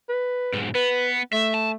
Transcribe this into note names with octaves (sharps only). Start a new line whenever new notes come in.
B4
B1 G#2
B3 B4
A3 E5
A5